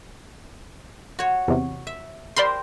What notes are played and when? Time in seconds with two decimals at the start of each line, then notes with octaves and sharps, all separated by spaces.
1.19 F#4 C#5
1.48 E2 C3
1.87 E5
2.37 G4 A#4 C5 D5 B5 C6